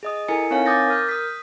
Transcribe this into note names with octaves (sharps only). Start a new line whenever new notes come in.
G#4 D#5 D#6
E4 A4 A#4 G#5 C#7
C4 D#4 A#4 C#5 F5 G#5
D6 D#6 G6 A6 A#6
A#4 F6 G6
D#6 B6